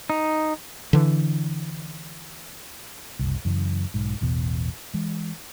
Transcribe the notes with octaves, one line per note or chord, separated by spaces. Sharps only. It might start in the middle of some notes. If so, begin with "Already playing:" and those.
D#4
D3 E3
F#1 C2
F#2 C#3 E3
B1 G#2
A1 E2 B2
E3 G#3